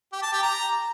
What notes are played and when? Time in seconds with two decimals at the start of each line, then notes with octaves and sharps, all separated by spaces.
0.12 G4
0.22 A5
0.33 G4
0.43 A#5